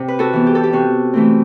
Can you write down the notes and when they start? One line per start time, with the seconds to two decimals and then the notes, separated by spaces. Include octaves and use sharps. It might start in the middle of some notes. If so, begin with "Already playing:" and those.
Already playing: C3
0.08 B4
0.19 F#4 A4
0.33 E3 B3
0.46 G4
0.55 A4
0.63 G4
0.73 C3 F#4
1.13 E3 A3 C4